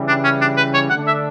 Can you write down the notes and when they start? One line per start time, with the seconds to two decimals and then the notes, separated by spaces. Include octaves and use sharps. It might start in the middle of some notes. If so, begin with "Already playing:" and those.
Already playing: C#3 E3 G3
0.08 D4
0.24 C#4
0.41 D4
0.57 B4
0.74 C#5
0.90 D3 A3 D4 F#5
1.07 E5